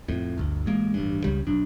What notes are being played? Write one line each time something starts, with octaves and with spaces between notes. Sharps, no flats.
F2 A2
G1 D2
A1 G#3 A#3
A1 G2
C#2 C#3 G3
B1 F#2 D4